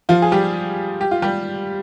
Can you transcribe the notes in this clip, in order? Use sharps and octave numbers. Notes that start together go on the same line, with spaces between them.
F3 F4
G#4
G3 G4
G4
F4
G3 G4